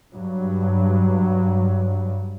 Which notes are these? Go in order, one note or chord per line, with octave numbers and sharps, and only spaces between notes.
G2 F#3